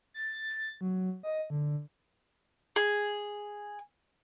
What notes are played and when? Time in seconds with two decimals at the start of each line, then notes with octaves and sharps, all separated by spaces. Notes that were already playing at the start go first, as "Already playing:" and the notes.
0.14 A6
0.49 A6
0.81 F#3
1.23 D#5
1.50 D3
2.76 G#4